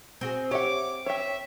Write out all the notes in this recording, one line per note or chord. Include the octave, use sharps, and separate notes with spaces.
C4 F#4 G#4
G4 C#5 E5 F#5 D6
C#5 E5 G5